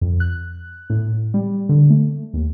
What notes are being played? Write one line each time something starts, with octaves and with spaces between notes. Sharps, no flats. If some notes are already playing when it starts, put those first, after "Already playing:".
F2
F#6
A2
G3
D3
A3
D#2